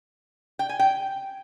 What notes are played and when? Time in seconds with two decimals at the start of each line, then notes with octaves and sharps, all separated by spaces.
0.59 G5
0.69 G#5
0.79 G5